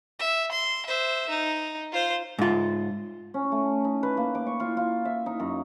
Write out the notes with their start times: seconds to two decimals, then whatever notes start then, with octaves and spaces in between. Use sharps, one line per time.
0.19 E5
0.52 C6
0.86 C5 E5
1.29 D#4
1.92 F4 C5
2.39 G#2 F4
3.34 C#4
3.52 A3
3.85 D#4
4.03 B4
4.17 A#3
4.35 D6
4.46 C#6
4.60 F4
4.77 F4
5.05 E5
5.26 D#4
5.40 F#2